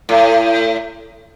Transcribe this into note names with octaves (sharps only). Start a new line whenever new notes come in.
A2